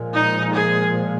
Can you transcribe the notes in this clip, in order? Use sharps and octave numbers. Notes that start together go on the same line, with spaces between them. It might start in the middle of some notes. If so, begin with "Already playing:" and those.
Already playing: A#2 F3 G#3
D#4
G#4